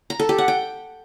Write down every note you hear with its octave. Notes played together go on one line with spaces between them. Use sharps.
A#5
A4
G4
F#5
G5